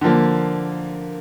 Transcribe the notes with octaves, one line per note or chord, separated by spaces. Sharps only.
D3 F3 A#3